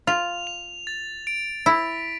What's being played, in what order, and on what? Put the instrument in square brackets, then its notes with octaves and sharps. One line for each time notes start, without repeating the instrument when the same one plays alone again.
[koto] F4 [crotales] F7
[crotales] F7
A6
D7
[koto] E4 [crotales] B6